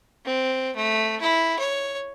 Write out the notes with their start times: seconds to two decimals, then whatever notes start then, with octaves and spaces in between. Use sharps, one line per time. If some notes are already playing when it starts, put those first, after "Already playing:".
0.25 C4
0.76 A3
1.21 E4
1.59 C#5